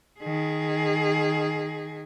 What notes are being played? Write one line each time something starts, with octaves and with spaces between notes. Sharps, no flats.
D#3 G#4